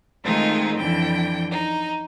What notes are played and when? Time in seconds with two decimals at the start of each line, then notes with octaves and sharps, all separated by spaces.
0.25 D#3 G#3 A3 C4 D#4 F4
0.77 F2 D3 E3 G5
1.50 D#4